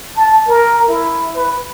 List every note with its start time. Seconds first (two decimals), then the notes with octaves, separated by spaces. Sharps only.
0.16 A5
0.48 A#4
0.88 E4
1.36 B4